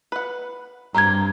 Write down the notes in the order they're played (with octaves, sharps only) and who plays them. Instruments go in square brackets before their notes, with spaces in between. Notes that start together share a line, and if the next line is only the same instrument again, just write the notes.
[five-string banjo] B4 F#5
[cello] G2 [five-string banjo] C4 G4 A#4 [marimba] A#5 G#6